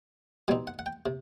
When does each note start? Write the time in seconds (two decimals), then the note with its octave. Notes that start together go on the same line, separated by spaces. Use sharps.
0.48 B2 G3 C4 D#4 G#5
0.67 F#5
0.79 F#5
0.86 G5
1.06 C3